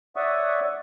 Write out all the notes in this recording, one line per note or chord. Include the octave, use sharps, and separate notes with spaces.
C#5 D5 E5 F#5 C#6 D#6